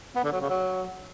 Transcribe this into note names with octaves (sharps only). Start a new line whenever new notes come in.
B3
D3
F#3
C#3
F#3